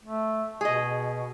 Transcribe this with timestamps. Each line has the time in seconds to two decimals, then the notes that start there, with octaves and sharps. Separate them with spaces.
0.04 A3
0.61 B2 G#4 D#5